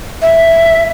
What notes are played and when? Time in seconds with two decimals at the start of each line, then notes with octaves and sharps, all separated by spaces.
0.22 E5